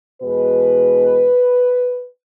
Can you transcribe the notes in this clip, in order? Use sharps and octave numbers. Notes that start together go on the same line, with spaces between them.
E2 B2 G#3 B4